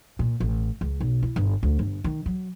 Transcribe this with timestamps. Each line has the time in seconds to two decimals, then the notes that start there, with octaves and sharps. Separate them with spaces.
0.19 A#2
0.40 A1
0.81 C#2
1.01 B1
1.23 E4
1.36 G1
1.63 D2
1.79 G1
2.04 D#3
2.26 F#3